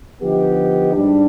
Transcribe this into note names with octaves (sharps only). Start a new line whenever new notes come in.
D3 F3 B3 D#4 G4
G#2 G3 D4